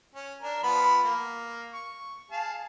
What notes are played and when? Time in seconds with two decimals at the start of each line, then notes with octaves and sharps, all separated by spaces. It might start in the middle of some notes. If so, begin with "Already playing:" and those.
0.15 C#4
0.42 D4 A#4
0.64 F3 B3 B5
1.04 A#3
1.74 C#6
2.31 G#4 F5 A5